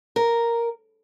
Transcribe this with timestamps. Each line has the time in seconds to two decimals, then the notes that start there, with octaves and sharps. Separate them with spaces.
0.16 A#4